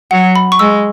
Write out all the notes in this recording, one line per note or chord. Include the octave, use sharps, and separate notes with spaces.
F#3 F#5
B5
C#6
G#3 E6